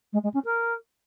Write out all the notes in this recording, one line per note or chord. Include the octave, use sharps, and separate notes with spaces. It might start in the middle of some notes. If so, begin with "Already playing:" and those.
G#3
G#3
C#4
A#4